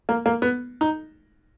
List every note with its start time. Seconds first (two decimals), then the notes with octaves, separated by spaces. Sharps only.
0.09 A#3
0.26 A#3
0.42 B3
0.81 D#4